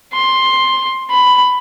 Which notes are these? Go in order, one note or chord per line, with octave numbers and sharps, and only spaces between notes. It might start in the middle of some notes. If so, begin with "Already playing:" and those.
C6
B5